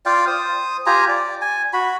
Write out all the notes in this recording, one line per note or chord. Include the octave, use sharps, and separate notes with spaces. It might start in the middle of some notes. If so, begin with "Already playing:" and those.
F4 D5 F5 G5
C5 D#6
F4 G4 G#5 A#5
D5
G#5
F#4 B5